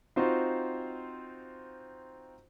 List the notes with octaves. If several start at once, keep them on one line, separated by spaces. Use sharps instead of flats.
C4 D#4 F4 F#4 C5